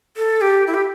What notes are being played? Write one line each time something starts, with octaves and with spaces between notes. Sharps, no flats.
A4
G4
E4
G4